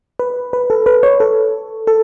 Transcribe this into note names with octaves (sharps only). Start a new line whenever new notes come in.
B4
B4
A4
B4
C#5
A4
A4